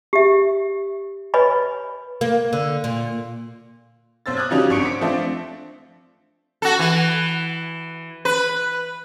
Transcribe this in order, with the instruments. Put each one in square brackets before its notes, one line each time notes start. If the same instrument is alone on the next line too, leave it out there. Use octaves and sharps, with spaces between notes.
[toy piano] G4 E5
B4 C#5 D#5 G#5 B5
[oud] A#3
D3
A#2
[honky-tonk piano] B1 C5 E6 A6
D6 D#6 F6 F#6 G#6
C#3 F3 G3 C#4 D#4 F#4
G#1 D4 C#6 C#7 D7
C5 D6 D#6 B6
F3 A3 C4 D4
[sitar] F#4 A4
E3
B4